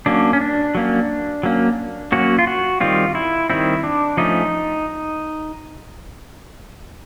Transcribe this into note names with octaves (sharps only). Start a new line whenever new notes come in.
F#3 A#3 C#4 D4
C#4
D4
F#3 A#3 C#4
F#3 A#3 C#4
F#3 A#3 C#4 F#4
F4
F#4
D#3 G3 C4 F4
E4
D#3 G3 C4 E4
D4
F3 A3 C#4 D#4